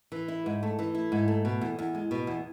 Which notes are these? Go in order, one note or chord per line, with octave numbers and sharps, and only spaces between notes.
E3
E4
G#2
A3
E3
E4
G#2
A3
B2
E2
E2
G#3
B2
E2